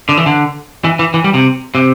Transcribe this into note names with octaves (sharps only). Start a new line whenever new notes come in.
D3
E3
D3
E3
E3
E3
G3
C3
C3